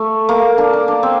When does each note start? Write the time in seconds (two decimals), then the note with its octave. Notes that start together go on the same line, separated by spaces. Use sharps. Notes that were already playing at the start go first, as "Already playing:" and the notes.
Already playing: A3
0.29 A#3
0.58 D4
0.73 D4
0.88 D4
1.03 C4